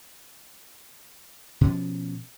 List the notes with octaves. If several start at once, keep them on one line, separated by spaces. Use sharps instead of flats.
B2 F3 C#4